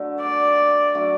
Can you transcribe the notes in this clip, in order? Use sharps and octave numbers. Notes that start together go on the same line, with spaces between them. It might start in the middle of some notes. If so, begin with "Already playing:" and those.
Already playing: D3 F#3 A3
D5
F#3 A3 D4 F#4